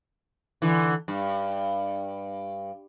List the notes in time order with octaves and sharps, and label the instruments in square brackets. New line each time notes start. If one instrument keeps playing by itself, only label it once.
[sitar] D3 E3
G2